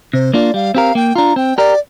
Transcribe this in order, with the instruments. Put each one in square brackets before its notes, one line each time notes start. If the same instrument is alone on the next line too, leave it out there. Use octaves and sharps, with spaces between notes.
[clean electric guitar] C3 [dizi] C5
[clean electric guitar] A#3 D4 F4 [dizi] D5
[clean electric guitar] G3 [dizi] F5
[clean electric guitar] C4 G4 A#4 [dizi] F5
[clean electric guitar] A#3 [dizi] G5
[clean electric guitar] D4 F4 [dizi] A#5
[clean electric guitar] C4 [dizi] G5
[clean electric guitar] G4 A#4 [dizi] D5